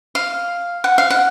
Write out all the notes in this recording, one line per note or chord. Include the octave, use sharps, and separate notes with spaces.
F5
F#5
F5
F#5